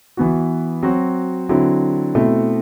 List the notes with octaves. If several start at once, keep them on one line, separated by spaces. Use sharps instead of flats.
E3 B3 F#4
F#3 C4 F#4
D3 F#3 C4 E4
B2 A3 C4 E4